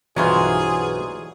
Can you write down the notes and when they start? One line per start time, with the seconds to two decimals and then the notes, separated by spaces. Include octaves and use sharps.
0.16 B1 G2 B2 E3 F#3 F4 G#4 C5